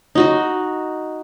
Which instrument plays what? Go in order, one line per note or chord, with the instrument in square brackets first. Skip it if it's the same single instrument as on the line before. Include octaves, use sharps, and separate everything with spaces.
[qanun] D#4 F#4 D#5